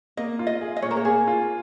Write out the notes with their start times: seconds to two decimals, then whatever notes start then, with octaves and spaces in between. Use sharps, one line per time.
0.17 A#3 D#5
0.39 F4
0.47 D#5
0.61 G#4
0.76 D#5
0.82 A#2 C#5
0.91 A#4
0.97 C#5
1.05 A#3 G#4
1.28 F4